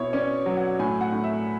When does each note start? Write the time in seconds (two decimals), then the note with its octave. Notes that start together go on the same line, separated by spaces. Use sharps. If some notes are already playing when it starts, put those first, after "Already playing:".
Already playing: B2 E4 C#5
0.13 C#4 D5
0.46 F#3
0.57 F#5
0.79 A2 G#5
1.01 F#5
1.12 A2
1.24 E5